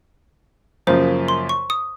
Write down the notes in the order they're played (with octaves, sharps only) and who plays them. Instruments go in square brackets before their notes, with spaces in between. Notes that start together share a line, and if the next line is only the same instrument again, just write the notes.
[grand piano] F#2 C#3 F3 A#3 F4 [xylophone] C5
[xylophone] C6
C#6
D#6